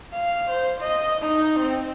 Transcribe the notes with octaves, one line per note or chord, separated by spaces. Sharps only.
F5
C5
D#5
D#4
C4